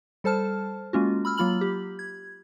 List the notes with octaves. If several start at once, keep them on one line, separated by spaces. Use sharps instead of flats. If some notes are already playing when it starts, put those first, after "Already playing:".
G3 A4 C5 A5 F6
G#3 A#3 C#4 F4 F#4
B5 E6 F6
F#3 A#3 F4 B5 F6 F#7
G4
G#6